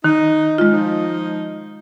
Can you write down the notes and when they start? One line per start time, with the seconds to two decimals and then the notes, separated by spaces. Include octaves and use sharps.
0.04 D#3 D#4
0.58 G#3 F4
0.73 F3 D#4